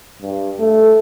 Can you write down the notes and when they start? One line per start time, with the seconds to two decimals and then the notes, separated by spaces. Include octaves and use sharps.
0.22 G2
0.59 A3